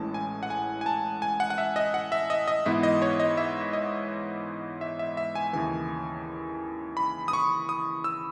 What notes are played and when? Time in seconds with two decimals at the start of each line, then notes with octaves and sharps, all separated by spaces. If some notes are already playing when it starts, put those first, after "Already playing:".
Already playing: A1 A2 E3 G#3 C#4 A5
0.14 G#5
0.43 F#5
0.50 G#5
0.81 G#5
0.86 A5
1.22 G#5
1.40 F#5
1.50 F#5
1.58 E5
1.76 D#5
1.94 F#5
2.12 E5
2.30 D#5
2.47 D#5
2.66 G#2 E3 B3 E4 E5
2.83 D#5
3.02 C#5
3.20 D#5
3.37 E5
3.73 D#5
4.81 E5
4.99 E5
5.17 E5
5.35 G#5
5.53 D#2 C#3 E3 G#5
6.97 B5
7.28 D#6
7.33 C#6
7.69 D#6
8.04 E6